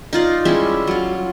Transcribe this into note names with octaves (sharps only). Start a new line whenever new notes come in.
D#4 F4 D5
G3 G#3 C#4 E4
F#3 F4